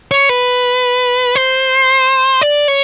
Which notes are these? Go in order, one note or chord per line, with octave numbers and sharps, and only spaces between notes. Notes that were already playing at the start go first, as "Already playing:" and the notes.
C#5
B4
C5
D5
C#5